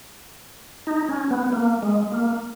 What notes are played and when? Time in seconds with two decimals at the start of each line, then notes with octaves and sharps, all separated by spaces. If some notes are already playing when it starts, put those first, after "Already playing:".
0.87 D#4
1.09 C#4
1.31 B3
1.53 A#3
1.82 G#3
2.12 A#3